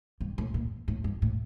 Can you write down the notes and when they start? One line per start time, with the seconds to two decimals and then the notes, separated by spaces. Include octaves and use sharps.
0.20 G2
0.38 A2
0.54 A#2
0.88 A2
1.04 G2
1.22 A2